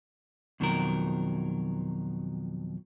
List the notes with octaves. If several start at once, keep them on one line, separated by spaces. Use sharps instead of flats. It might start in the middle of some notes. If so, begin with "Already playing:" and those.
F2 B2 D#3 F3 F#3 A#4